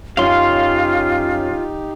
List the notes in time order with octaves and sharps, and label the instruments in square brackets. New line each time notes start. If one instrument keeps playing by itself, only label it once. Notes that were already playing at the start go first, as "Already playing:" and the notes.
[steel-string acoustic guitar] F#2 C#4 [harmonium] D#4 G4 [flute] F4 [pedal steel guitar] F5 C6